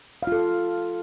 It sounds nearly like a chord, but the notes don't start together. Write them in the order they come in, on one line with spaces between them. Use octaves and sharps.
F5 F4 A4